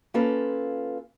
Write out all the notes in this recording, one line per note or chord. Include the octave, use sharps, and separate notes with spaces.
A#3 C#4 F4 A4 B4